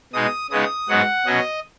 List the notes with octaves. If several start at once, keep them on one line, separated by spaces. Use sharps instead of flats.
B2 G#3 D#4 D#6
C#3 G#3 B3 D#4 D#6
G#2 F#3 B3 D#4 F#5
B2 F#3 C#4 D#5